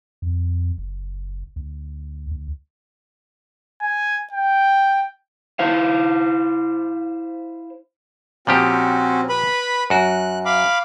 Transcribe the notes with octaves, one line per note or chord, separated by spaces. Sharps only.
F2
F#1
D2
D2
G#5
G5
E4 C5 F5
A#2 F3 C4 C#4 F#4 G4
B4 B5
F#2 F#4 F#6
F5 B5 D6